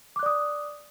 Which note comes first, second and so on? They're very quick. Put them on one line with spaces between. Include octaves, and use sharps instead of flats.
D6 F#6 D5 D#6